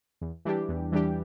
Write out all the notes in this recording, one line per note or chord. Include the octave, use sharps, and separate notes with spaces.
E2
E3 G3 D4 G4
E2
E3 G3 D4 G4